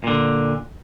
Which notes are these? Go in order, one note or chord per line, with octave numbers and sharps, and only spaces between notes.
A#2 D3